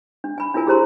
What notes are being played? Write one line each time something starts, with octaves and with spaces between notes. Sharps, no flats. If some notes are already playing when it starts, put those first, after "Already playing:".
D4
G#5 B5
D4 E4 F4 A#4 G#5
G4 G#4 A#4 C5 A#5 C6